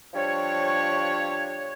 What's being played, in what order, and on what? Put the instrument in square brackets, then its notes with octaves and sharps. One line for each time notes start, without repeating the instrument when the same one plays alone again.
[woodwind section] F3 G3 D4 C#5